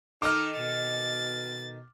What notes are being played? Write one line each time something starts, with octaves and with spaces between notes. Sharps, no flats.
D#3 D#4 A4 D#5 D6 F6
B2 A6